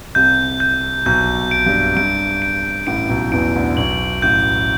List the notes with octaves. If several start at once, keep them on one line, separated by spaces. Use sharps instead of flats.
C2 C3 G6
G6
B1 B2 G6
D7
G2
G2 D7
D7
A1 A2 D7
B1 B2
E2 E3 D7
D2 D3
B1 B2 F#7
A1 A2 G6